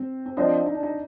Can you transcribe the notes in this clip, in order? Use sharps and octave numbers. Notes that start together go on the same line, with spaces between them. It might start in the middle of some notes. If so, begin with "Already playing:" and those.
Already playing: C4
C4
F3 C4 D4 F4 C5 D#5
D#4
D4
D#4